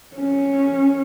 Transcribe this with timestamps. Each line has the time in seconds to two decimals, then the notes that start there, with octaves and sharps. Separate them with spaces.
0.16 C#4